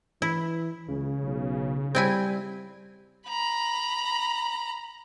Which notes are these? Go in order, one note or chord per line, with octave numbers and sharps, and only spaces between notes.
E3 E4
C#2 C#3
B1
G3 C4 E4 G#5
A#5 B5